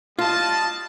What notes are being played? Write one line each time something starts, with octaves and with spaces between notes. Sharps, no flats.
G3 F4 D#5 A5